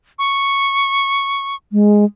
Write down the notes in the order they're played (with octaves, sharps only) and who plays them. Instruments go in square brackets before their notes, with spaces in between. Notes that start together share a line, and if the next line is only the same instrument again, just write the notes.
[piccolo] C#6
[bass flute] G#3